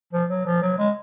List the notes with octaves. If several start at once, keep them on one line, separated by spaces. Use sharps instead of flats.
F3
F#3
F3
F#3
G#3